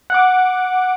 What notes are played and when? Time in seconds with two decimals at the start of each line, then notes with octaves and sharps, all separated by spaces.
0.10 F#5 D6